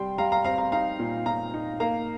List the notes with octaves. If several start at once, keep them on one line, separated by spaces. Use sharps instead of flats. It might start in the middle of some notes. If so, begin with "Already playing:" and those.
Already playing: C3 G3 G5 C6
G3 F5 A#5
F5 A#5
C4 F5 A#5
F5 A#5
D#4 F5 A#5
A#2
A#2 F5 A#5
D#4
A#3 F5 A#5